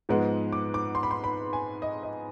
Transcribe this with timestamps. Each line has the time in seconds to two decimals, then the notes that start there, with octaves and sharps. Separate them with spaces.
0.09 G#2 F3 G#3 B3
0.53 D6
0.74 D6
0.95 C6
1.03 B5
1.11 C6
1.24 B5
1.53 G#5
1.82 D#5
2.03 D#5